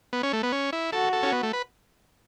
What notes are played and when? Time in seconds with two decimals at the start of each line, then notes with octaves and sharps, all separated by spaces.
0.13 B3
0.23 C#4
0.33 A3
0.43 B3
0.52 C#4
0.73 E4
0.93 F#4 A4
1.13 A4
1.23 C#4
1.33 B3
1.43 A3
1.53 B4